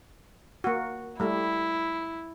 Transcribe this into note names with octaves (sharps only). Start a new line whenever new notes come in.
A#3 F#4
G3 A3 E4